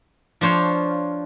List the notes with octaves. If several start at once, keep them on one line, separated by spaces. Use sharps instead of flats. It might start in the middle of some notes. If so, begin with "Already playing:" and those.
F3 D4 C5 C#5 F5